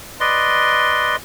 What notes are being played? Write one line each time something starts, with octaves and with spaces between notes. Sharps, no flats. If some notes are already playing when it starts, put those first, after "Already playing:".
B4 D5 D#5 C6